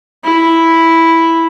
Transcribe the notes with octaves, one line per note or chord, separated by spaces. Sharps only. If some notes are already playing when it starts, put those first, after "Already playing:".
E4